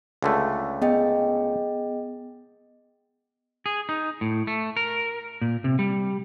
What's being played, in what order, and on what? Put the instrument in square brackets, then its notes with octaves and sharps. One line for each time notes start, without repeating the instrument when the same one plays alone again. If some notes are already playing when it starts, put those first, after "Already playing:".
[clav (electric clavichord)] C#2 D3 A3
[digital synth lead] B3 [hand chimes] G#4 D#5 G5
[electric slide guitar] G#4
D#4
A2
A3
A#4
A#2
C3
G3